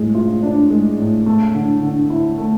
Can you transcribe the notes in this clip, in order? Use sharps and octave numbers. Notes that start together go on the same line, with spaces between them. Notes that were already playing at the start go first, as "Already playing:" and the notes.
Already playing: A2 G#3
F4
D4
G#3
A2
A3
D3
D3
E4
A3